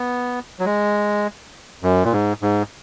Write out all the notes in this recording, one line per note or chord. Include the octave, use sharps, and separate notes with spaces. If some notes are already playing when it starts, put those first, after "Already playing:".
Already playing: B3
F#3
G#3
F#2
A#2
G#2
G#2